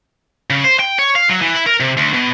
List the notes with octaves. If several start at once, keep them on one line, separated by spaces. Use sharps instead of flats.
C#3
C5
G5
C#5
F5
F#3
E3
E4
A#4
C3
D2
B2